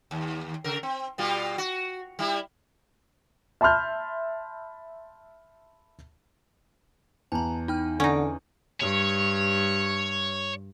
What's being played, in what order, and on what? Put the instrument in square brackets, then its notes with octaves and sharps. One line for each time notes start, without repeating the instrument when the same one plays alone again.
[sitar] D#2
C#3 A#4
C4
B2 G3 F4
F#4
G3 E4
[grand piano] E5 A5 B5 C6 F6 G6
[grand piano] E2 [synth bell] A5 A#5
[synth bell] D#4 G5 F6
[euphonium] D3 [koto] C#4 D#4 [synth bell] F#5 C#6 D#6
[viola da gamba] G2 [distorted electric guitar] C#5